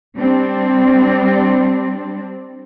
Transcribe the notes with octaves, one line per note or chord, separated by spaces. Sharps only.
G3 C4 D4